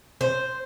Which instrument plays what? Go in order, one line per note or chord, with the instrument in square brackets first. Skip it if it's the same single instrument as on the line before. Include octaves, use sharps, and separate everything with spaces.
[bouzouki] C5